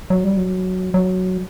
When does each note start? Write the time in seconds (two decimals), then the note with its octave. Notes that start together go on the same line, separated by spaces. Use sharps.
0.10 F#3
0.24 G3
0.37 F#3
0.94 F#3